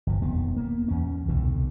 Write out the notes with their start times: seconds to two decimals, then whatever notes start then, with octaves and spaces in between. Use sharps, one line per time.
0.07 G1 F3
0.22 E1 F2 D#3 B3
0.57 A#3 B3
0.88 E2 C#4
1.28 C2 B2 D3 D#3